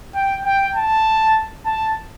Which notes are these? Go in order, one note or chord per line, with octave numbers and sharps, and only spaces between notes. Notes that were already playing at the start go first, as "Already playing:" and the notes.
G5
G5
A5
A5